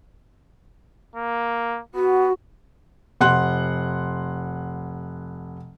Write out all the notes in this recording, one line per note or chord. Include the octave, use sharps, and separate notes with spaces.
A#3
B3 F#4
F1 F#5 C6 F#6